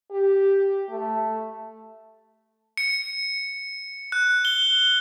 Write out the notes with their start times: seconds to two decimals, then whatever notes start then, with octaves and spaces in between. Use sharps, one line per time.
0.11 G4
0.90 A3
2.77 C#7
4.12 F#6
4.45 G7